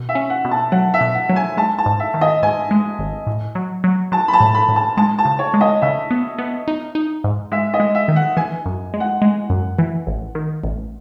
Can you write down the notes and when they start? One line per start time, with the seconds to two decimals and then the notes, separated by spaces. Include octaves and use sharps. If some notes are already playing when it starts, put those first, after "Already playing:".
Already playing: B2
0.09 E5
0.15 C#4
0.30 F#5
0.45 B2
0.51 A5
0.72 F#3 F#5
0.94 E5
1.01 B2
1.14 F#5
1.30 F#3
1.36 G#5
1.57 G#3 A5
1.78 A5
1.86 G#2
2.00 E5
2.14 D#3
2.21 D#5
2.42 G#2 G#5
2.71 G#3
2.99 G#1
3.27 A2
3.55 F#3
3.84 F#3
4.12 F#3 A5
4.28 B5
4.33 A5
4.40 A2
4.55 B5
4.69 A2
4.76 A5
4.97 G#3 A5
5.19 A5
5.25 C#3
5.39 C#5
5.54 G#3
5.61 D#5
5.82 C#3 E5
6.11 B3
6.39 B3
6.68 D#4
6.95 D#4
7.24 G#2
7.52 G#3 E5
7.74 D#5
7.80 G#3
7.95 E5
8.08 D#3
8.16 F#5
8.37 E3 G#5
8.66 F#2
8.94 G#3
9.00 F#5
9.22 G#3
9.50 F#2
9.79 E3
10.07 A1
10.35 D#3
10.64 A1